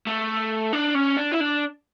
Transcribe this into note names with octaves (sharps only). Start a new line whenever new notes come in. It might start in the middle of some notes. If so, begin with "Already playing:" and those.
A3
D4
C#4
D4
E4
D4